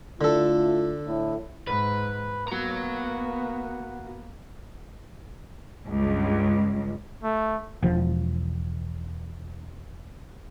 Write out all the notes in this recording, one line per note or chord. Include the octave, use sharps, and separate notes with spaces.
D3 A3 E4 F4 A4
A2
G#2 B4
A#3 B3 F#4 A#5
C#2 G2
A3
E1 F3